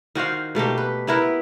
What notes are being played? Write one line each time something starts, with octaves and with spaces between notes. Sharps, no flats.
D#3 F#4 C5 F5
B2 A3 A#3 G4
B4
B3 E4 A#4 B4